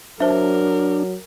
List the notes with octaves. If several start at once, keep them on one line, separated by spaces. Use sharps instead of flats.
F#3 D4 A#4 C5 E5